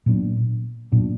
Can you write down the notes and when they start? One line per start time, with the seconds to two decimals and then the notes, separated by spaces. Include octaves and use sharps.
0.06 A#2 F#3 B3 D4
0.92 A#2 F#3 B3 D4